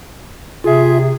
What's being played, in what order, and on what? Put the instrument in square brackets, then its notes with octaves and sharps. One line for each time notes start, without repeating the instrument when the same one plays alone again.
[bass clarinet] C3 [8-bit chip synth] F4 E5 [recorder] G#4